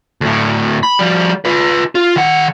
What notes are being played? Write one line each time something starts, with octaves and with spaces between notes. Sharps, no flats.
D2 A2
B5
F3 G3
F4 B4
F4
D#3 F#5